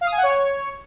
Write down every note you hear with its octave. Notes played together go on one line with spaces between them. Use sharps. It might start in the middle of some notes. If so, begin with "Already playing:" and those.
F5
D#6
G#5
F#5
C#5